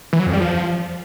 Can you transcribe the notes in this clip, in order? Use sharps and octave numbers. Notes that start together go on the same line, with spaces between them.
E3
F#3
F2
G3
F3